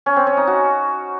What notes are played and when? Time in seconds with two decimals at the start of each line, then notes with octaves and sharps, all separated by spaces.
0.06 C#4
0.16 C4
0.27 C#4
0.37 D#4
0.47 F#4